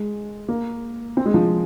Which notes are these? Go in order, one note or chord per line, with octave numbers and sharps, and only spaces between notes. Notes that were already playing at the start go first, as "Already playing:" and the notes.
Already playing: G#3
A#3
C4
G#3
F3